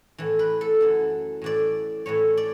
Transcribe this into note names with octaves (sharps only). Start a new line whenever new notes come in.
A2 E3
B4
A4
F#2 E3
A2 E3 D5
A2 E3 C#5
D5